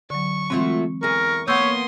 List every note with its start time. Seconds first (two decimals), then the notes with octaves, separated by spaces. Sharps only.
0.10 D3 F#3 C#6
0.50 E3 F#3 G#3 A3 C4 F4
1.03 E2 G#4 A#4 C#6
1.48 A#3 B3 C#5 C6 D#6 E6 G6